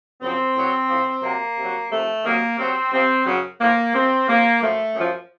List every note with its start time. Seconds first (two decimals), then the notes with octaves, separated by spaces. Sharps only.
0.21 F#2 C#3 F3 C4
0.55 A2 F#3
0.89 A2 F3
1.23 C3 F#3 A#3
1.57 C3 F#3
1.91 C3 F3 A3
2.24 C3 D#3 F#3 A#3
2.58 C3 F#3 C4
2.92 C3 F3 C4
3.26 F#2 C#3 F#3
3.60 A2 F3 A#3
3.93 C3 F3 C4
4.28 C3 F3 A#3
4.61 F#2 F3 A3
4.95 F#2 F3